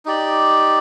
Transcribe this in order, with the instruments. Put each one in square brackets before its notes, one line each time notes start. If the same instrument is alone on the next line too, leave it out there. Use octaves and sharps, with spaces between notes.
[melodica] D#4 G4 D5